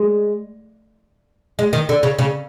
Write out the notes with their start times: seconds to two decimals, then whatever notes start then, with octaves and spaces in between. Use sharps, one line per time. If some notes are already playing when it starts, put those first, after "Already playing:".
Already playing: G#3
1.59 G#3
1.73 D#3
1.89 D3
2.03 C#3
2.19 C#3